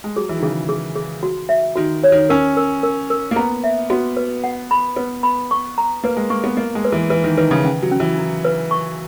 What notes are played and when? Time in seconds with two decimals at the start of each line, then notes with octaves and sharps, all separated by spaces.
0.04 G#3
0.16 F#3 G#4
0.29 E3
0.37 D#3
0.42 C#3 G#4
0.69 G#4
0.95 G#4
1.23 F#4
1.49 E5
1.76 D#3 F#4
2.04 C#5
2.12 D#3
2.29 C#4 A#4
2.57 A#4
2.83 A#4
3.10 A#4
3.31 A#3
3.36 B3 A#5
3.64 E5
3.90 B3 F#4
4.17 B4
4.44 F#5
4.71 B5
4.96 B3 B4
5.23 B5
5.51 C#6
5.78 A#5
6.04 A#3 B4
6.17 G#3
6.30 A#3 C#6
6.44 B3
6.57 A#3 D#5
6.75 G#3
6.85 B4
6.92 E3
7.10 E3 B4
7.24 D#3
7.37 D#3 B4
7.51 C#3
7.65 C#4
7.83 F#3
7.91 C#4
8.00 E3
8.18 E4
8.45 B4
8.71 C#6